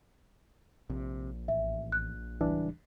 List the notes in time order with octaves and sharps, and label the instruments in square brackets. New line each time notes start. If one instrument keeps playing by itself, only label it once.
[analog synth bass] A#1 [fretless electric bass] C3
[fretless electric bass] A1 [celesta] E5
[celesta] F#6
[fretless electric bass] D1 C#2 G3 [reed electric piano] E3 D4